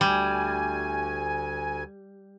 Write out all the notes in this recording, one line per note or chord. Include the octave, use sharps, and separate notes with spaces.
D2 G3 G#5